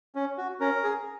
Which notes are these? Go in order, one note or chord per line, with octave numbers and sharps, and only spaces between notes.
C#4
F#4
C#4 A#4
G#4